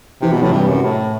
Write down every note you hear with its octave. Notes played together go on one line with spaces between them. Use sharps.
C3 E3
B2 F#3
A2 C3 E3
G2
F#2
A2